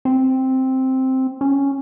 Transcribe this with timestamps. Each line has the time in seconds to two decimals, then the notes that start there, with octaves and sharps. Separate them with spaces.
0.05 C4
1.41 C#4